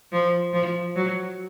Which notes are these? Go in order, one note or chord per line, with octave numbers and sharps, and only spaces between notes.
F3
F3
F#3